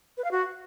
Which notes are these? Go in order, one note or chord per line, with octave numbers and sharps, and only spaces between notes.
B4
F5
F#4